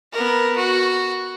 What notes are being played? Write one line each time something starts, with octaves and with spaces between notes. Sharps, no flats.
B3 A#4
F#4